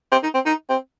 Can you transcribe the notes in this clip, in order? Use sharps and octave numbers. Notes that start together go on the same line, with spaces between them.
C4
D#4
C4
D#4
C4